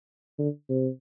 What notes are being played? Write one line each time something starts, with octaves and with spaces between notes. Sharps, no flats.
D3
C3